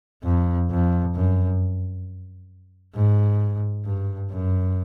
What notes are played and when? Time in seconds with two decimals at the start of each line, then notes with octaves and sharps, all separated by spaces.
0.24 F2
0.70 F2
1.15 F#2
2.95 G#2
3.85 G2
4.30 F#2